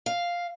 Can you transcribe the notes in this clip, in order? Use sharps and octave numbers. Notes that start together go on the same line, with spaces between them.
F5